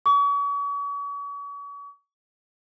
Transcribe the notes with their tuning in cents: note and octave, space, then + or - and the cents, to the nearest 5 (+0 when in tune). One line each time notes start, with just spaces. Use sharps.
C#6 +40